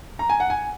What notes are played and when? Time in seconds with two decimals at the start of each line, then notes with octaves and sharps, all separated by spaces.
0.19 A#5
0.30 G#5
0.40 F#5
0.50 G#5